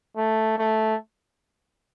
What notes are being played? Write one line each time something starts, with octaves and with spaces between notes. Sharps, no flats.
A3
A3